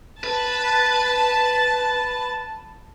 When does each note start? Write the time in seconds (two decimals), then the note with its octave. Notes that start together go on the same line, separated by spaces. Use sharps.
0.24 B4 A5